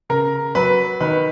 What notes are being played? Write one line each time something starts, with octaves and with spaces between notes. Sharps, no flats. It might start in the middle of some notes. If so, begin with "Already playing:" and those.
C#3 A#4
F#3 B4
D#3 B4